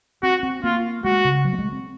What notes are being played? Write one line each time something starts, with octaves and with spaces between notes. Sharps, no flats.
C4 F#4
C4
A#3 F4
G#3 F#4
C#3
F#3
A#3
G#3
C4